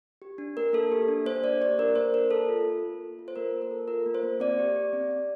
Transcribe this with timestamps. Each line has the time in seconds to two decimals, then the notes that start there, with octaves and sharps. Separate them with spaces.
0.22 G4
0.38 D4
0.57 A#3 A#4
0.73 A#3 A4
0.92 G4
1.08 D4
1.26 A#3 C5
1.44 A#3 D5
1.61 G4 D5
1.78 D4 A#4
1.95 A#3 C5
2.14 A#3 A#4
2.31 A4
2.49 F4
2.66 A#3
2.83 A#3
3.01 A4
3.19 F4
3.28 C5
3.36 A#3 A#4
3.53 A#3
3.62 A#4
3.71 A4
3.88 F4 A#4
4.06 A#3
4.14 C5
4.23 A#3
4.40 C4 D5
4.59 G4
4.76 G4
4.93 C4
5.11 C4